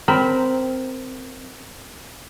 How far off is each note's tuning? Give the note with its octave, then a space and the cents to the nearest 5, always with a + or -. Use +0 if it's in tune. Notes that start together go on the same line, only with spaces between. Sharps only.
C4 -10 A#4 +0 B5 +0